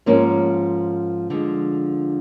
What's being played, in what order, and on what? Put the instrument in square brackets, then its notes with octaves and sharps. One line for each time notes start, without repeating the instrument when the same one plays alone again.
[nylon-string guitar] G#2 F3 A#3 C#4
D3 F3 G#3